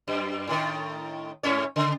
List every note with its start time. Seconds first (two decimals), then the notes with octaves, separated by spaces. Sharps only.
0.08 F#2
0.47 A2 D#3
1.43 G#2 C#4 C#5
1.76 C#3